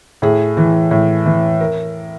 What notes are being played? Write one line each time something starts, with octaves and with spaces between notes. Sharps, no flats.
A2 G#4
E3
A2
E3
A#4